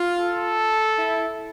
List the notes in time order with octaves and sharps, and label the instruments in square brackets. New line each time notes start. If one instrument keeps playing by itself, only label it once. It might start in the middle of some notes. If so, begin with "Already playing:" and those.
Already playing: [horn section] F4
[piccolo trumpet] A4
[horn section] E4